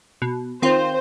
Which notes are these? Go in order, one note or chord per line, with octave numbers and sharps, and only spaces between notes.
B2
D#3 C4 F4 C5